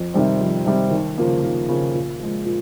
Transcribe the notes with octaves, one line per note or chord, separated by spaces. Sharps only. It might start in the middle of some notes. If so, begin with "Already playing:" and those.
Already playing: F2
C3 D#3 G3 C4
F2
C3 D#3 G3 C4
D#2
C#3 F3 A#3
D#2
C#3 F3 A#3
A#2
F3 G#3
A#2